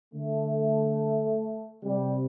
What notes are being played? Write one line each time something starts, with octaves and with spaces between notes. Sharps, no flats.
D3 A3
C3 G3